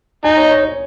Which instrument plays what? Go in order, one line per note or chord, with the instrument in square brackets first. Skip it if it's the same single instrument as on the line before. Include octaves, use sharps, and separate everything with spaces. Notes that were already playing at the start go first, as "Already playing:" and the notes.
[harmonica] D#4 [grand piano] G#5
[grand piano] C#5
C#5
C#5